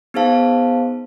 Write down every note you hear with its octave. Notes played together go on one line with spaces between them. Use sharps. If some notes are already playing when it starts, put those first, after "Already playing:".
B3 D#4 G#4 C5 F5 A5